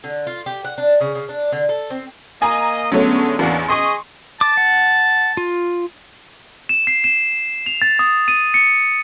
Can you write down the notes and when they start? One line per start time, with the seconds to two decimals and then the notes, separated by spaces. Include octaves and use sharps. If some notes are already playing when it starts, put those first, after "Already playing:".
0.04 D3
0.27 F4
0.46 G4
0.65 F#5
0.78 D4
1.01 C#3
1.15 C#3
1.29 D4
1.52 D3
1.69 A4
1.90 C4
2.42 A#3 D#5 G#5 A#5
2.92 D3 F#3 G#3 A3 B3 C#4 C#5
3.39 A1 E2 A#3 D4 F#4
3.69 G#4 D#5 C6 C#6
4.41 A5 D6
4.57 F#5
5.37 F4
6.69 E7
6.87 C7
7.04 E7
7.66 F7
7.82 A6
7.99 D#6
8.28 D#7
8.54 C#7